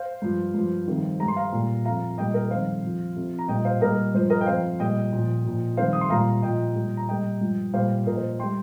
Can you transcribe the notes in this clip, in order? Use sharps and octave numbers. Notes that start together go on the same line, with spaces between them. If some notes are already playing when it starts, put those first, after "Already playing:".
Already playing: C5 F5
G2 F3
G2 F3
F2 C3 D#3 G3
G2 G3 A#5
C6
F5 A#5
A#2 G3
F2 F3 F5 A#5
A#2 G3 D#5 G5
A#4 D#5
F2 D#3 G3 C5 F5
F2 F3
F2 C3 F3
A#5
A#2 G3 D#5 G5
C5 F5
A#2 G3 A#4 D#5
G2 F3 C5
A#4 D#5
G5
F2 F3 C5 F5
A#2 G3 D#5 G5
A#2 F3
A#2 F3
F2 D#3 G3 C5 F5
D#6
C6
A#2 G3 F5 A#5
A#2 F3 D#5 G5
A#2 G3
A#5
A#2 G3 D#5 G5
G2 F3
A#2 G3 C5 F5
A#2 F3 A#4 D#5
C5
G3 G5 C6